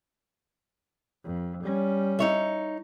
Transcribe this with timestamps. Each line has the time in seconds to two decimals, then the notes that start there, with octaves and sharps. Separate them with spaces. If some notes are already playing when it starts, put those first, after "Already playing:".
1.24 F2
1.64 G3 C#4
2.19 D#4 C#5 E5